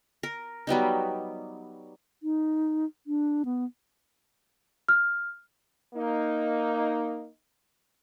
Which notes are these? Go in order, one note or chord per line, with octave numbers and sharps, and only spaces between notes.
A#4
F#3 G3 B3 D#4
D#4
D4
B3
F6
A#3 D#4